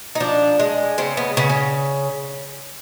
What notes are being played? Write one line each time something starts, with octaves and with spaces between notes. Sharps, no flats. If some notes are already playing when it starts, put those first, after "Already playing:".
D#4
F3 D4
G#3
C#3 C4
B3
C#3 B3
C#4